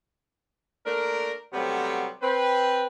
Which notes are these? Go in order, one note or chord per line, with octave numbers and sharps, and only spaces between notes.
A3 A#3 D4 A#4
C3 F#3 G3 A3 B3 C4
C4 B4